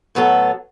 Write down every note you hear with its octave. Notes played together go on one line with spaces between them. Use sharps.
A2 F#3 B3 F#4 A4